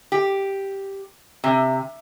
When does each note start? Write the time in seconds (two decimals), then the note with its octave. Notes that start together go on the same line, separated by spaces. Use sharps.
0.12 G4
1.44 C3